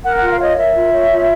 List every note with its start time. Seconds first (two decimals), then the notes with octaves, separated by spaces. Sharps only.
0.05 A#4 F#5
0.17 F4 F#5
0.31 F5
0.40 C#5 D#5
0.57 A#4 E5
0.75 F4
0.92 C#5
1.09 F4